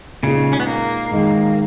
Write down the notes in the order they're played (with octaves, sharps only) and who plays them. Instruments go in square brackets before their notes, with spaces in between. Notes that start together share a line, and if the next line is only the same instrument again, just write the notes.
[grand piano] A#2 G#3 D#4 G#4 [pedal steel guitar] C#3
[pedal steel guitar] C#4
B3
A#3
[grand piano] G#2 D#3 G#3